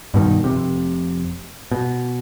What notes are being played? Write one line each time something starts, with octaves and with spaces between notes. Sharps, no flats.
G2 B2 D#3
F1 C3
B2